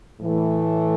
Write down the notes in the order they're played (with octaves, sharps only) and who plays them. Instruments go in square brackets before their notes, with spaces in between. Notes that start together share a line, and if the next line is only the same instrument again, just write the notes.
[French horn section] A2 E3 A3